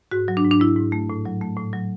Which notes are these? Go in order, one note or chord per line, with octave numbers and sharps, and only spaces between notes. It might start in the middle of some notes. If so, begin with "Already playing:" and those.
G#2 F#4
F#3
D4
G#2
D4
G#2 E4
G#2
A3
A2
F#3
A3
A2
F#3